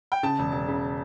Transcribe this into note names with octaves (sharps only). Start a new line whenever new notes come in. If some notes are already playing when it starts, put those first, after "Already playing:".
G5
C#3 A5
E1
E1
C#3